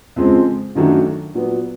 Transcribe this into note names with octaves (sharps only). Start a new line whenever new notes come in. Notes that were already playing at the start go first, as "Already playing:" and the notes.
F2 C#3 F3 G#3 C4
F#2 D#3 F#3 A3 D4
A#2 F#3 B3